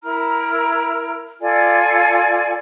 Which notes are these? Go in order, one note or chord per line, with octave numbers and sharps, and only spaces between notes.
E4 A#4 A#5 F6
F4 A4 D5 G#5